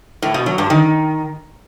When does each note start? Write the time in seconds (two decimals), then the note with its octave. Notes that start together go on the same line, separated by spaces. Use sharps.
0.22 A2
0.34 B2
0.46 F#3
0.58 G2
0.70 D#3